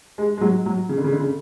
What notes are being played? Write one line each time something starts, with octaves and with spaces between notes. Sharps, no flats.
G#3
G#3
F#3
F#3
C#3
D3
C#3
D3
C#3